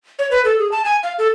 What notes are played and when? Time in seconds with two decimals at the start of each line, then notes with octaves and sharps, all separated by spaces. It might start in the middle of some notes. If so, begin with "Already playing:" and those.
0.19 C#5
0.31 B4
0.45 A4
0.59 G#4
0.72 A5
0.85 G#5
1.03 F5
1.19 A4